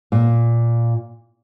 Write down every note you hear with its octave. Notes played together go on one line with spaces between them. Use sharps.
A#2